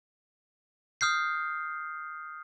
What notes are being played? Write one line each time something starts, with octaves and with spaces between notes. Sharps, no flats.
D#6 F6 G6 C7